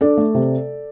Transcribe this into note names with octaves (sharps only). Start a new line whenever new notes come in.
D4 A4 D5
A3
C3